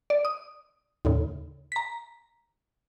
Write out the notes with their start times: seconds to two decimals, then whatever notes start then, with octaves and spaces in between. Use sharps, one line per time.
0.10 D5
0.25 D#6
1.05 D#2 A2 C#3
1.72 A#5 B6